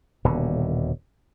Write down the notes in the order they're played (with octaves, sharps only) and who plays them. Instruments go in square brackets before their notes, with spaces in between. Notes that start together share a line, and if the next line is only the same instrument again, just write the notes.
[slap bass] D#1 B2 D3